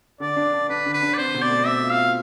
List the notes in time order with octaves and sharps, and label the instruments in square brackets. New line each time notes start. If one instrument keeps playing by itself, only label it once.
[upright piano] D3 [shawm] D5
[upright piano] D4
D4
[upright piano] D4 [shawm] B4
[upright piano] D3
[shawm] B4
[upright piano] D4
[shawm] D5
[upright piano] C4 [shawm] C5
[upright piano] B2
[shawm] D5
[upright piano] A3
[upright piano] C4 [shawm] E5
[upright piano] F4
[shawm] F5
[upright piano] F4